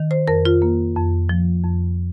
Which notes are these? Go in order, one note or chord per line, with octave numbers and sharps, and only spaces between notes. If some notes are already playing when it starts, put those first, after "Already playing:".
Already playing: D#3
C5
F2 A#4
F4
A#3
F2
F3
F2